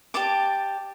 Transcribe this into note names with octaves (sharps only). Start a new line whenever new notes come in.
G4 D5 A5 D6